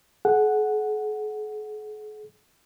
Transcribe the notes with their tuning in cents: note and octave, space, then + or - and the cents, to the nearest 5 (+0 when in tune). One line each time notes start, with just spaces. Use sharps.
G#4 +45 F#5 +0